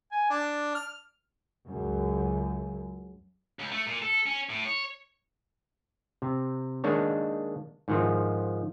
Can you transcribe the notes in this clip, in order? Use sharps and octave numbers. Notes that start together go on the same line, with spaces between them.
G#5
D4
F6
C#2 F#2
C#2
A3
A#2
A4
C#4
A2
C#5
C3
D#3 G#3 A#3 D4 C#5
G#2 D#3 F3